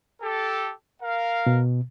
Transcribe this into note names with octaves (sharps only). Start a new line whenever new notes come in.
G4 A4
A#4 F5
B2